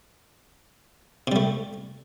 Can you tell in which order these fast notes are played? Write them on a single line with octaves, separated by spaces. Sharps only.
C3 G3 A3